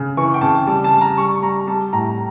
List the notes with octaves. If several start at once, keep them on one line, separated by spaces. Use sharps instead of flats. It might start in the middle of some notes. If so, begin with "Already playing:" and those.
Already playing: C#3
E3 C#6
G5
C#3 A5
G3 A5
A5
G3
A#5
G3 C#6
G3 A#5
G3 A5
A2 A#5